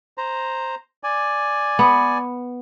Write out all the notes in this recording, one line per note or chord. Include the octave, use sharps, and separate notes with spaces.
C5 A#5
D5 G#5
B3